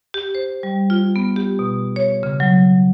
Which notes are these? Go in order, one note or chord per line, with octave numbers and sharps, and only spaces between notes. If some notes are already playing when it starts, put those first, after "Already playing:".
G4
C5
G3
F4
B3
G4
B2
C#5
C#3
F#3